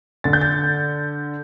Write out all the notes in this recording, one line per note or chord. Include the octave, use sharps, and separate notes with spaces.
D3 A6
G6
A6